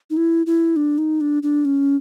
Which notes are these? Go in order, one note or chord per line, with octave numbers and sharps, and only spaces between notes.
D#4
E4
E4
D4
D#4
D4
D4
C#4